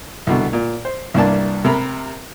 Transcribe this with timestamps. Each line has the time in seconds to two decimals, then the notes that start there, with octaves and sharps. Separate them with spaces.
0.27 C2 B2 D3
0.53 A#2
0.85 C5
1.14 C2 G2 A#3 D4 A5
1.65 C3 A#4 B5